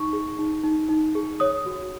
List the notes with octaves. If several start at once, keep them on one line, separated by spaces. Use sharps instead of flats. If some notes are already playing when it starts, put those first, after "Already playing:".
Already playing: D#4 C#6
G#4
D#4
D#4
D#4
G#4
C#5 D#6
F#4